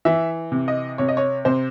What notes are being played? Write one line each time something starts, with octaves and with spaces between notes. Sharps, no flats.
E3 E5
C3
D#5
C3 C#5
D#5
C#5
C3 C5